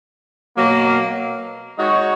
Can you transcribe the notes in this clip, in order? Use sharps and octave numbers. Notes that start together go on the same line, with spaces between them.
B2 F#3 A#3
G#3 D#4 F#4 C#5